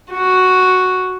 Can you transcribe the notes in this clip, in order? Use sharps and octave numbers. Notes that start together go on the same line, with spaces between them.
F#4